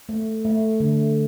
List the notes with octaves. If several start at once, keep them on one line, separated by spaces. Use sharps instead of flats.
A3
A3
D3